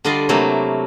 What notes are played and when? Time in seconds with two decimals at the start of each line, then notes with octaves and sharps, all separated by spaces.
0.04 D3 G3 F4 D5 D#5 C6
0.29 C3 F#3 A3 A#3 E4